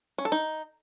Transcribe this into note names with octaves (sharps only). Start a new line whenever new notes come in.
C#4
A4
D#4